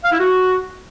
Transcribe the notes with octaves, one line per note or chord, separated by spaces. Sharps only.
F5
E4
F#4